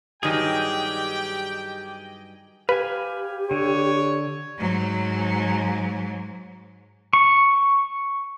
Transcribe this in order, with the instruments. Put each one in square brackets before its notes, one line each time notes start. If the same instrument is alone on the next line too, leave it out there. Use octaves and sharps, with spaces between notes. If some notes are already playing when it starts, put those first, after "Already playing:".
[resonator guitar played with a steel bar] G2 D#3 F#3 [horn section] G4 G5 [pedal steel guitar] G#4 D#5
[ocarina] G4 [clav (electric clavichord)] B4 [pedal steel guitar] F5 G#5
[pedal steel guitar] D3 [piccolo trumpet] C#5
[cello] G#2 F#3
[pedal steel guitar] C#6